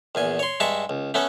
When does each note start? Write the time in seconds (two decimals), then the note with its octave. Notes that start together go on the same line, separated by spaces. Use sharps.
0.15 A#1 E2 G#5
0.39 C#5 C6
0.60 G2 G#3 E5 A5 C#6
0.89 C#2
1.14 A3 B3 C#4 A4